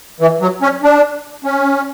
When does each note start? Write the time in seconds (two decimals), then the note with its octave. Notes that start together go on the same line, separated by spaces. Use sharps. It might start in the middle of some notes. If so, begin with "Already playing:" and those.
0.20 E3
0.41 F#3
0.62 C#4
0.83 D4
1.44 C#4